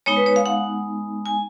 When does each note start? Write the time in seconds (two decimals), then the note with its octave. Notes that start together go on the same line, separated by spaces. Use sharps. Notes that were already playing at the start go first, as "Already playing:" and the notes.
0.06 G#3 B3 D#4 C#5
0.16 B4
0.26 C#5
0.36 F5
0.46 F#5
1.26 G#5